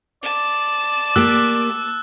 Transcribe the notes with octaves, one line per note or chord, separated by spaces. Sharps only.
D5 A5
A#3 G4 E6 F#6